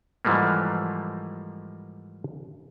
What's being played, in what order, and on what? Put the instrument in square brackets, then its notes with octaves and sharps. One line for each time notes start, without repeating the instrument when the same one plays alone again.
[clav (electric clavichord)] G#2 E3 F3 G3 A3 A#3